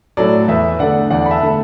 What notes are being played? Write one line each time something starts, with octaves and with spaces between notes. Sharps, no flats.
A2 F#3 A4 D5
E2 B4 E5
D3 A3 D5 F#5
E2 D5 F#5
B5
E5 A5
D3 A3